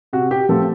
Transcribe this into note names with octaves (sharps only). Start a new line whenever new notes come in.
C3 F#4
G4
F3 A3 C4 A4